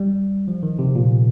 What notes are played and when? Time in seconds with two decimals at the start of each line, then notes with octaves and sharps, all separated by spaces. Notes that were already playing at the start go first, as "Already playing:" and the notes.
Already playing: G3
0.48 F3
0.63 D#3
0.79 C3
0.96 A#2